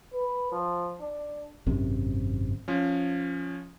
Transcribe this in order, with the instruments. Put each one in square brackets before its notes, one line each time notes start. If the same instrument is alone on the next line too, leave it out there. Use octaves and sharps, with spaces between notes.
[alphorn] B4
F3
D4
[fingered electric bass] G#1 F#2 C3
[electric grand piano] F3 C#4